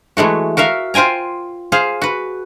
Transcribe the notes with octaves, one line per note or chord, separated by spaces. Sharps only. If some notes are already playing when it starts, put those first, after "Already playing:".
E3 G#3 A3 F#4
F#4 A#4 E5 F5
F4 C5 G5 G#5 A#5
G#4 C5 F5
F#4 B4